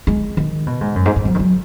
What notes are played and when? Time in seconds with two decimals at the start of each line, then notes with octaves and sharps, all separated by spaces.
0.07 G#3
0.37 D#3
0.67 B2
0.81 G#2
0.96 F#2
1.05 G#2
1.16 G#2
1.25 F#3
1.35 D#3
1.39 F#3